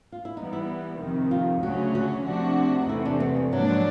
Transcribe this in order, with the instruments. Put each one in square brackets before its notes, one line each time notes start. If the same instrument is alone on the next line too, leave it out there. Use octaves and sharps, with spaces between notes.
[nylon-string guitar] F4
E4
[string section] E3 G3 B3 [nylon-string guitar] D#4
[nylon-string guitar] E4
[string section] F2 C3 D#3
[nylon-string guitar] F4
[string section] D2 C#3 F#3 A3 C#4 [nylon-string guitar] F#4
[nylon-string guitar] F#4
[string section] C3 F3 A3 D4 F#4
[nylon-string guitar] D#4
[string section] E2 C3 E3 A3 [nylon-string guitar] E4
[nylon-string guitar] D4
B3
G3
[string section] G#2 F3 A#3 D4 [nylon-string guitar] F#3
[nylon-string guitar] F#3